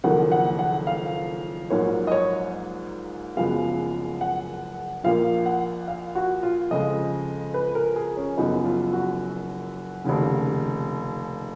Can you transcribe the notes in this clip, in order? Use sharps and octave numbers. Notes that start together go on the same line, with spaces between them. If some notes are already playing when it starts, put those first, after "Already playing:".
F#1 F2 D#3 A#3 F#5
F#5
F#5
F5
A#1 G#2 F#3 A#3 C#5
D#5
C#5
F#1 F#2 F3 G#3 B3 F5
F#5
A#1 A#2 F3 A#3 F5
F#5
F5
F#4
F4
F2 C#3 G#3 D#5
B4
A#4
G#4
C#4
F#1 F#2 F3 B3 D#4
F4
F#4
F1 D#2 C#3